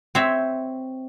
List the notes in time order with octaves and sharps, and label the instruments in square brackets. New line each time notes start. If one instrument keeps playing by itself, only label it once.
[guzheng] C4 C5 C#5 E5